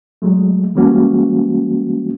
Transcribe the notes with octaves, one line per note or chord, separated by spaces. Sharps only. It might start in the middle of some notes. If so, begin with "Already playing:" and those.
F#3 G#3 A3
E3 G3 G#3 A#3 C#4 F#4